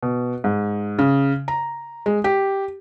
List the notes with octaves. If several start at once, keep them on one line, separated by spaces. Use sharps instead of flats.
B2
G#2
C#3
A#5
G#3
G4